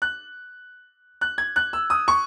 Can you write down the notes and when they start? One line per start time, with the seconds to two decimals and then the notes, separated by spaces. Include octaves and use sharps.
0.02 F#6
1.21 F#6
1.38 G#6
1.56 F#6
1.73 E6
1.90 D#6
2.08 C#6